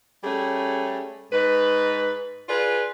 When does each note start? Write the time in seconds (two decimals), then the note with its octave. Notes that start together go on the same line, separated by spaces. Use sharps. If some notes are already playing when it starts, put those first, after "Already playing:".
0.24 G3 A3 C#4 G#4
1.32 G#2 D#4 B4
2.48 F4 G#4 B4 D5